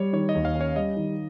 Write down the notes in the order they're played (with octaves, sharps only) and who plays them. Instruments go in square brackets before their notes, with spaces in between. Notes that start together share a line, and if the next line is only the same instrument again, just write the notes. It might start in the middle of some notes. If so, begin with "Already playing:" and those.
Already playing: [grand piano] G3 [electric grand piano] C#5
[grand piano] D#3 [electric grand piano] C#5
[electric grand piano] D#5
[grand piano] D#2
[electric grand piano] F5
[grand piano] C#4
[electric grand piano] C#5
[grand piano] G3 [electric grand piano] D#5
[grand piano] D#3